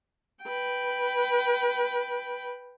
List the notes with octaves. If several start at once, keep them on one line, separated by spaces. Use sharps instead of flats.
B4 G5